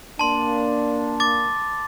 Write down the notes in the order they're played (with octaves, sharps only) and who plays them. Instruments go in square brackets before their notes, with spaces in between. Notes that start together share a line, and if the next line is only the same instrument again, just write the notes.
[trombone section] A#3 D4 [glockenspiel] A5 C6
[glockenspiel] D6 A6